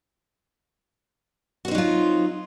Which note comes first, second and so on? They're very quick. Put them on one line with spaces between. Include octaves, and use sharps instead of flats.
F#4 C4 D#4 F#3 F4